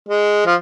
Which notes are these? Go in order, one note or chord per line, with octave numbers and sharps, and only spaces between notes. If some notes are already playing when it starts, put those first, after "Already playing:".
G#3
F3